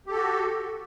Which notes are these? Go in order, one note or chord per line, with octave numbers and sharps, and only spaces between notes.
F#4 G4 A4